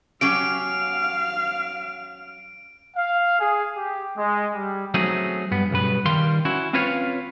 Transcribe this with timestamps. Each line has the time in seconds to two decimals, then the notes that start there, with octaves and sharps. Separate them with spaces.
0.21 F#3 C#4 G4 F5 D7
2.96 F5
3.40 G#4
3.77 G4
4.17 G#3
4.53 G3
4.94 F#3 A3 C4 C#4 D#4 G#4
5.51 G2 B3
5.71 B1 G2 C#3 B4
6.05 D#3 G3 F5 G5 C6
6.45 C#4 E4 F#4
6.73 C4 C#4 F4 B4 C#5 F5